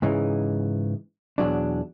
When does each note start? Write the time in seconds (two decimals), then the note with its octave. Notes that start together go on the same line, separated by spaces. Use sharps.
0.02 G#2 C#3 E3 D#4
1.38 E2 B2 F#3 D4